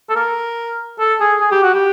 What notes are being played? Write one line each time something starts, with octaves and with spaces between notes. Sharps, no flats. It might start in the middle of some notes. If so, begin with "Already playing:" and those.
A4
A#4
A4
G#4
G#4
G4
F#4
G4